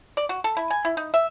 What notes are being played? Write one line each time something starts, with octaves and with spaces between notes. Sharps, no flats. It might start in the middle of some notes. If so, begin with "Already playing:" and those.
D5
F#4
A4
E4
G#5
E4
D#4
E5